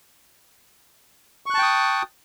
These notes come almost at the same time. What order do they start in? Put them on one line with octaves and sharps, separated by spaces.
C#6 F#6 A5 G5 D#6